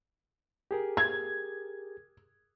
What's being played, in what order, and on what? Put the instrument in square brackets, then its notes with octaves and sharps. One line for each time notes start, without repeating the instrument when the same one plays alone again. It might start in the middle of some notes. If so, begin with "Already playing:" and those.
[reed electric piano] G4 G#4 A#4
[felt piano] G#6